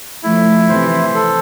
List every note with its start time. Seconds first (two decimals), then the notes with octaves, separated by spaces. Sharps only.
0.23 F3 A3 E4
0.69 C3 E3 C5
1.15 A4